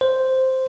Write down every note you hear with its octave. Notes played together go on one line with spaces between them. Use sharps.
C5